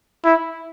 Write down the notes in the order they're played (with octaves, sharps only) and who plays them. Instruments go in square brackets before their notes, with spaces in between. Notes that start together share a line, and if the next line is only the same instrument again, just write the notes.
[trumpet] E4